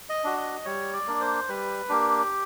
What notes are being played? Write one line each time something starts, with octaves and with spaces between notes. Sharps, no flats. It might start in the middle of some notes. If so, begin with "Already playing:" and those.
D#5
D4 F#4
D#5
G3 C#5
D5
A#3 D4
C5
G3 B4
A#3 D4 G4